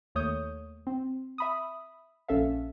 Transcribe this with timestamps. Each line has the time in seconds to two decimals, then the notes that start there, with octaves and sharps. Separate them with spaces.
0.15 D#2 A3 C#5 D#6 G6
0.87 C4
1.38 E5 B5 D#6
2.28 A#1 C#4 A4 E5 F5